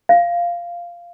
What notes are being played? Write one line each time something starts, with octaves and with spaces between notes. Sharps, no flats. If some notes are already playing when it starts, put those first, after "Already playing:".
F5